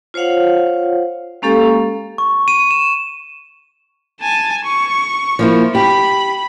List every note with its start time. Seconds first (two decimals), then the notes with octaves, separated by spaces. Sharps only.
0.14 F4 C5 C#5 F5 F#5
1.42 G#3 A#3 C#4 G4 A4 F5
2.18 C#6
2.48 D#7
2.71 E7
4.20 G#5 A5
4.64 C#6
5.39 F3 A#3 E4
5.75 G4 B5